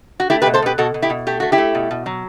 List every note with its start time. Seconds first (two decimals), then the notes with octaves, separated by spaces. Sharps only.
0.20 F#4
0.30 A3 E4 G4
0.42 G4 B4
0.46 B2
0.54 A4 C5
0.62 B2 G4 B4
0.78 B2 F#4 A4
0.94 B2
1.02 E4 G4
1.10 B2
1.27 A3 G4
1.40 A3 F#4
1.52 E4 G4
1.58 A3
1.75 B2
1.91 B2
2.06 F#3